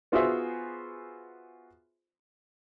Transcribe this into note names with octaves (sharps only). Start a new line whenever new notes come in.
B3 F4 F#4 G#4 C5 E5